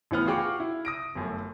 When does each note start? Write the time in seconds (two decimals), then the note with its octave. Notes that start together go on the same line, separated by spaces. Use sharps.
0.11 A1 E3 B3 F6
0.26 F4 F#4 G#4 G5 C#6 D6
0.60 E4
0.85 D#6 A#6 D7
1.15 G1 F#2 A3